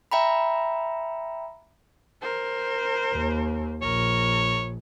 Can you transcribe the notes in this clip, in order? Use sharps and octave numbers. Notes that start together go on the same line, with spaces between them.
E5 G5 A#5 B5
A#4 C5
D#2
A#1 A#4 C#5